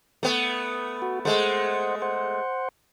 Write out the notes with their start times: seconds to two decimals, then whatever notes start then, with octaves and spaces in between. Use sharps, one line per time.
0.23 A3 B3
1.02 F#4
1.25 G#3 A3 C5 F#5
2.02 C5 F#5